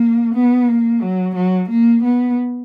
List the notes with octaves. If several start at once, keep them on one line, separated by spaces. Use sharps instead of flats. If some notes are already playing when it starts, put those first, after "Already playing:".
Already playing: A#3
B3
A#3
F#3
F#3
A#3
B3